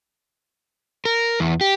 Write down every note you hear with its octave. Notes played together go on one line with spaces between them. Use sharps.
A#4
E2
G4